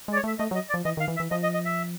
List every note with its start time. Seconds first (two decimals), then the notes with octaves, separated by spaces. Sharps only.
0.08 G#3 D5
0.16 C#5
0.24 A3 E5
0.39 A3 D#5
0.51 F#3
0.55 D#5
0.69 D5
0.74 F3
0.85 E3 D#5
0.97 D#3 F5
1.08 E3
1.16 E5
1.20 E3
1.31 F3 D#5
1.43 D#5
1.54 D#5
1.65 E5